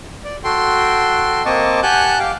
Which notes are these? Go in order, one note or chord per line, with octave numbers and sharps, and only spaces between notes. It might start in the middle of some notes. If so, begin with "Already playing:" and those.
D5
F#4 A4 G5 C6
A#3 C4 D#5 A5 C#6 D6
G4 F#5 G#5 A5 F#6 G6
G4 F5 G5 D6